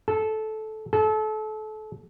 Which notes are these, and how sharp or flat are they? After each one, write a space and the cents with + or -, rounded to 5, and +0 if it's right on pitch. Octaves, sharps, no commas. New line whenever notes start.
A4 -15
A4 -30